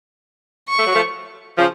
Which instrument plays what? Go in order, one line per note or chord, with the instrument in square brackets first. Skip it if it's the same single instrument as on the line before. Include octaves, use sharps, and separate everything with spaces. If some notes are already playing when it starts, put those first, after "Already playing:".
[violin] C#6
[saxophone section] A3
F#3
F3 A3
C#3 F3